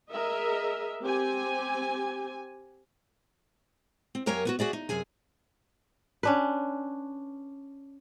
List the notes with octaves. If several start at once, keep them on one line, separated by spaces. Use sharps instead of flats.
G#4 A#4 D#5 E5
C4 G4 G#5
C4
F#2 G4 A#4 C#5 F5 G#5
B3 D#4 F#4
F#4 G#4 D5 E5
D#4
F#2 C3 G#4 G#5
C#4 D4 B4